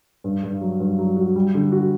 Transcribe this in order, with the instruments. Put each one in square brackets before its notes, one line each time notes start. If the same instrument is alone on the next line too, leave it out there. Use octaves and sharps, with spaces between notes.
[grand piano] G2
G2
F#3
G2
F#3
F#4
G3
D3
F#4